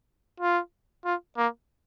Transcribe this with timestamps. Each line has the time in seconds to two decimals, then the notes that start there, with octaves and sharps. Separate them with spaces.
0.40 F4
1.05 F4
1.37 A#3